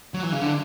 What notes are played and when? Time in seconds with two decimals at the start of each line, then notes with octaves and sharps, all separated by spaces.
0.14 F#3
0.23 E3
0.32 C#3
0.42 D3